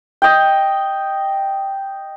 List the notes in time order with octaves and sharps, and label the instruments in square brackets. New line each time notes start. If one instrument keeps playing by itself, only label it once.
[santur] D#5 G5